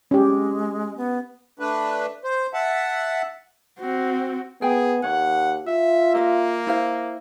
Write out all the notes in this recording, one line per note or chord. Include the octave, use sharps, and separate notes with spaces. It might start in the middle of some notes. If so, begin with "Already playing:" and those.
G#3 C#4 G4
B3
A3 D4 B4
C5
E5 F#5 A5
C4 F#4
B3 G#4 G5
D#2 C#5 F#5
F4 E5
A#3 D#5 E5
E4 C5 F5